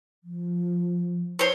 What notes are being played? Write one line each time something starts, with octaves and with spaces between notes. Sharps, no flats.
F3
C5 C#5